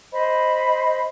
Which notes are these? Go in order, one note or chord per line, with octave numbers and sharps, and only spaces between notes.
C5 D#5 B5